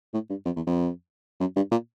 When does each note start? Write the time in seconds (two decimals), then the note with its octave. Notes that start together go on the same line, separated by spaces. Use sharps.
0.13 A2
0.30 G2
0.45 F2
0.56 E2
0.67 F2
1.40 F#2
1.56 G2
1.71 A#2